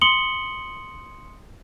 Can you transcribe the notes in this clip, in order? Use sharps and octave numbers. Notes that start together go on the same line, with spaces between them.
C6 D#6 C#7 F#7 G7